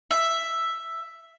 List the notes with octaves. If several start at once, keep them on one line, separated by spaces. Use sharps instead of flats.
E5